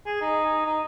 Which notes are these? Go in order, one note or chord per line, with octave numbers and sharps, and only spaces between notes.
G#4
D#4
D#4